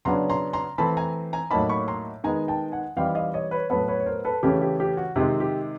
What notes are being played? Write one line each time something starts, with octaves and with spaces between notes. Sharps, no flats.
C#3 F#3 B3 D4 A#5 C6
A#5 C6
A#5 C6
E3 A3 C4 A5 B5
G#5 A#5
G#5 A#5
A2 F#3 A#3 D#4 A5 B5
B5 C#6
A#5 C6
D#3 G#3 B3 G#5 A#5
G5 A5
F#5 G#5
E3 G3 C4 D#4 F5 G5
D#5 F5
C#5 D#5
B4 C#5
A2 F#3 B3 A4 B4
B4 C#5
C#5
A#4 C5
A4 B4
C#3 E3 A3 C#4 G4
G4
G4
F#4
C3 D#3 G#3 C4 G4
G4